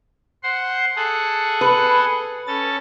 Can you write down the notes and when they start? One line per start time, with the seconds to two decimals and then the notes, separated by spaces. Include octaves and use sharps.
0.43 C5 F#5 C6
0.96 G#4 A4 F#5
1.61 B4
2.47 C#4 A4 A6